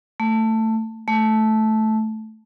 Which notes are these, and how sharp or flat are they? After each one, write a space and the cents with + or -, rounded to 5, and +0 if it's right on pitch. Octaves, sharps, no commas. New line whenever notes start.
A3 +15
A3 -10